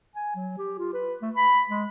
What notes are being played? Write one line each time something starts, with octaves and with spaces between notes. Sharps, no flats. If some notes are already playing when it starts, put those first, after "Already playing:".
G#5
F#3
G4
F4
B4
A3
B5
G#3